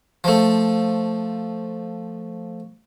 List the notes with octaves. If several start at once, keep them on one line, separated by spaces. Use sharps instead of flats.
F3 A3